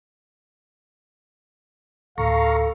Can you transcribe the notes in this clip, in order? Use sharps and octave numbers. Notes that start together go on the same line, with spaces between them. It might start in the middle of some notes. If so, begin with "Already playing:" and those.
D2 A2 A4 F5 A#5 C#6